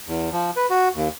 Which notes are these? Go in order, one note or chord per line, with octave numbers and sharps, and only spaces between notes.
E2
F3
B4
F#4
D#2